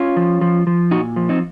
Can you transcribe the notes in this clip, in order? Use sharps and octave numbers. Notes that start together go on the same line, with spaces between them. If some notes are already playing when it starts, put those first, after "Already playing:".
Already playing: C#4 F4
F3
F3
F3
A#2 D#4 F#4
F3
C4 D#4